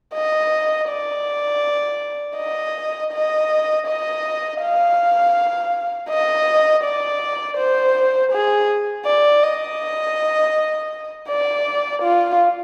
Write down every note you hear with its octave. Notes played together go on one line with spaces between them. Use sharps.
D#5
D5
D#5
D#5
D#5
F5
D#5
D5
C5
G#4
D5
D#5
D5
F4